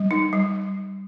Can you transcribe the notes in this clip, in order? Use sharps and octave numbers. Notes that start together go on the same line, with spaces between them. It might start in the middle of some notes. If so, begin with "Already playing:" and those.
Already playing: G3
D#4
G3